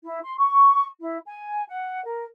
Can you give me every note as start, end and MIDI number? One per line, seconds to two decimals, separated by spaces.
0.03 0.19 64
0.23 0.37 84
0.37 0.85 85
0.99 1.17 64
1.25 1.63 80
1.67 2.02 78
2.06 2.25 70